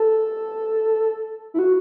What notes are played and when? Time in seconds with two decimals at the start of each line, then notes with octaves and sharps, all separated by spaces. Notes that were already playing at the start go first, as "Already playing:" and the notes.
Already playing: A4
1.54 E4
1.59 F#4